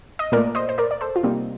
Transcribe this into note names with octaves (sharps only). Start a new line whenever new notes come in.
D#5
A#2 A3 A#4 D5
C5 D#5
C5
A#4 D5
D5
A4 C5
F4
C3 G3 A#3 C4 D#4